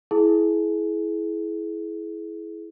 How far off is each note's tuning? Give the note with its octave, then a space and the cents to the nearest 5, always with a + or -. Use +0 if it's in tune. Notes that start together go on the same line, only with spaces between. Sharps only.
E4 +0 G#4 +30